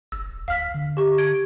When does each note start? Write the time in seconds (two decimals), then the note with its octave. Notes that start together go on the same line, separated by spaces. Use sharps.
0.12 G1 E6
0.29 D#1
0.48 D2 F5 F6 B6
0.74 D3
0.97 G4 C#6
1.18 G#6 D7